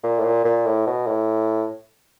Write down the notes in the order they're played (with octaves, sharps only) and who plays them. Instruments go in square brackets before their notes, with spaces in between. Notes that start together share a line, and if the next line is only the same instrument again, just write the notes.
[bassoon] A#2
A2
A#2
A#2
A2
B2
A2